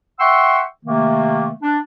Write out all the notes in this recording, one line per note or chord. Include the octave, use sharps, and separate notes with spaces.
E5 F#5 G5 C6 C#6 E6
C3 D#3 A3 A#3
D4